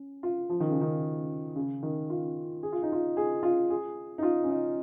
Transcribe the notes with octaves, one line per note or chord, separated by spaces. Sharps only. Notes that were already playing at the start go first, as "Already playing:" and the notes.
Already playing: C#4
F4
F3
D#3
C#3
D#3
C#3
D#3
F4
G#4
F4
D#4
F4
G#4
F4
G#4
D#4
F4
C#4
D#4